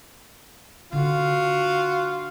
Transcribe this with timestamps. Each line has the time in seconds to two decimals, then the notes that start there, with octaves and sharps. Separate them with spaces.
0.92 D3 D4 F4 F#4